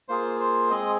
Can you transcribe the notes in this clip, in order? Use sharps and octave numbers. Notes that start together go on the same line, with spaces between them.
A#3 F4 G#4 C5
C5
G#3 C4 G#4 D#5